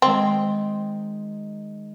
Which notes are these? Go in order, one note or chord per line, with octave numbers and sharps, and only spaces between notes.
D#3 G#3 C4